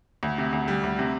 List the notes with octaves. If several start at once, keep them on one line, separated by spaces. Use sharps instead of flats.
D2
C3
D2
G3
D2
C3